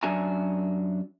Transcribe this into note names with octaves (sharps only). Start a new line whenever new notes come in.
F#2 D4 F#4 E5 G#5 A#5